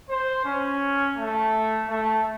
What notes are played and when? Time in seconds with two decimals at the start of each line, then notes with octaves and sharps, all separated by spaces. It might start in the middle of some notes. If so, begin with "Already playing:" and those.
0.09 C5
0.45 C#4
1.16 A3
1.89 A3